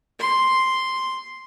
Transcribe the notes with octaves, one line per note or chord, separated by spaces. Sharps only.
C6